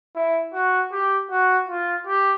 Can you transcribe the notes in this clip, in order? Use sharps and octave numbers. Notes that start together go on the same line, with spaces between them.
E4
F#4
G4
F#4
F4
G4